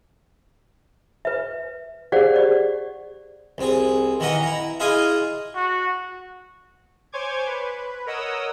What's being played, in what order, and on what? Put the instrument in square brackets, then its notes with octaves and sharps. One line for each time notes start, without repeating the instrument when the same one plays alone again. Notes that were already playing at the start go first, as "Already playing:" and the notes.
[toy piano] B4 E5
G4 G#4 C5 D5 F5 F#5
G4 D5
[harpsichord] C2 C4 G#4
D#3 E3 E4 D#5 F#5 A#5
E4 A#5
E4 F4 G#4 D#5 F5 G#5
[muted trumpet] F#4
[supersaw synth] C5 C#5 G#5 C6 D6 G#6
B4
A#4 C#5 D#5 F#5 D#6 E6